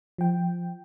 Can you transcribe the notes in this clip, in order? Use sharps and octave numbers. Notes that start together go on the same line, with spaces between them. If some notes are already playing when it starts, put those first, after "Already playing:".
F3 G5